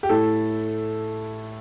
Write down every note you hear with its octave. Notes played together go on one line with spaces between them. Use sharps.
G4
A2 A3 E4 A4